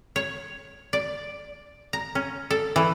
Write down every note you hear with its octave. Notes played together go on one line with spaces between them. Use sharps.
C#5
D5
A#5
C#4
A4
E3